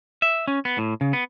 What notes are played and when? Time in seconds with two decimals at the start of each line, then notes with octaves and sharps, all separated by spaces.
0.22 E5
0.48 C#4
0.65 B3
0.78 A2
1.01 C#3
1.13 B3